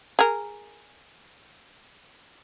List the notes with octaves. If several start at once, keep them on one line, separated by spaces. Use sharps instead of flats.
G#4 A#4